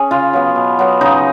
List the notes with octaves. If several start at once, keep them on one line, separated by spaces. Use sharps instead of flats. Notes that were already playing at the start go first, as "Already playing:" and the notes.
Already playing: C#4 G#4
C#3 F4
F#3 B3
B2
F#3 B3
C#3 D#4